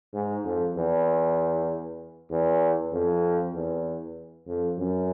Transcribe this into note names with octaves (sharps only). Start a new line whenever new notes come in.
G#2
F2
E2
E2
F2
E2
F2
F#2